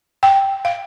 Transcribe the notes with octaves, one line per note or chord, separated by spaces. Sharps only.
G5
F5